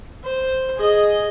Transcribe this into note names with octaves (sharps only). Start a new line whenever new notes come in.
C5
G#4 D#5